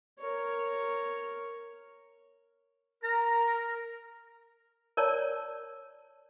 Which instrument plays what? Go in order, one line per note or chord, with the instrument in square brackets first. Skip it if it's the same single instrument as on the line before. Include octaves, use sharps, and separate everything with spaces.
[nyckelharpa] A#4 C#5
[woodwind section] A#4 [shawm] A#5
[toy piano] A#4 C#5 D5 A5